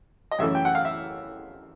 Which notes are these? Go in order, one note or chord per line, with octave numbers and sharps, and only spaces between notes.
D#5
F#2 C#3 E3 A3 C#4 E5
G5
F#5
F5
E5